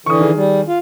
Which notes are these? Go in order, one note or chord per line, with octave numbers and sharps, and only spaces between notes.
D3 E3 C#6 D#6
D#3 G#4
G3
F4